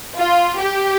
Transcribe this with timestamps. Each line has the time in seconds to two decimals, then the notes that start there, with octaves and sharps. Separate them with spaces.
0.17 F4
0.59 G4